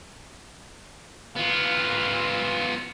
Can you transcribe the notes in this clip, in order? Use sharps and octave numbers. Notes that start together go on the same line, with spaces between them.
B3 F4 F5